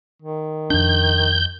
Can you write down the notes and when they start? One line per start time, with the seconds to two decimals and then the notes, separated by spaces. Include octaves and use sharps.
0.22 D#3
0.70 F2 D4 G6